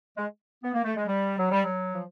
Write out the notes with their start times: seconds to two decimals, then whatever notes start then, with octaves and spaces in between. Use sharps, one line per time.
0.17 G#3
0.63 B3
0.74 A#3
0.85 A3
0.96 G#3
1.07 G3
1.39 F#3
1.51 G3
1.64 F#3
1.93 F3